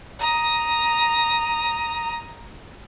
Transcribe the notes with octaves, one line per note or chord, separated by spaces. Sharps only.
A#5 D#6